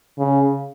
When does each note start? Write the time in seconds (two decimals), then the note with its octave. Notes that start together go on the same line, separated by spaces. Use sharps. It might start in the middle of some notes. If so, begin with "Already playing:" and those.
0.19 C#3